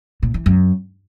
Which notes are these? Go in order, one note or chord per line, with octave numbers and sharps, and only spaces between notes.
A#2
E3
F#2